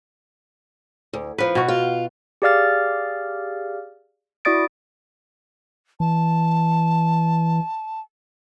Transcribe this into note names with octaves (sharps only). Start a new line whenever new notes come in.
D2
F#2 F3 B4
B2 F#4
F4
G4 G#4 D5 F5 F6 A6
E4 F#4 D5 D#6 A6 D7
E3 A5